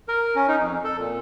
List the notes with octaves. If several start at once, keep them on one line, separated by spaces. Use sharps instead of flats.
A#4
C#4
D#4
F2
A4
A#2